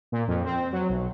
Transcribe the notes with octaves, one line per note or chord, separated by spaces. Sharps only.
A#2
F2
C4
F#3
B1